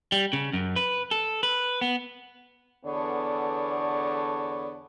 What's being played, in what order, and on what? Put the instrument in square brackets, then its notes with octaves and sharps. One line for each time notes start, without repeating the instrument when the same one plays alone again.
[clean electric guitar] G3
C#3
F#2
B4
A4
B4
B3
[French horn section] E2 D3 B3 A4 C#5 D5